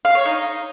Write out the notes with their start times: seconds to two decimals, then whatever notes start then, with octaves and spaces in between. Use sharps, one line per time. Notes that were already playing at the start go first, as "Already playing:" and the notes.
0.05 F5
0.15 C#5
0.25 D#4